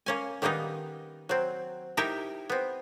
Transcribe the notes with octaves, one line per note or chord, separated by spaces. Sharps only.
A#3 C#4 G#5
D#3 G3 A#3 B3 D#4
F#3 C4
D#4 E4 G4 A#4 E5 G5
B3 C4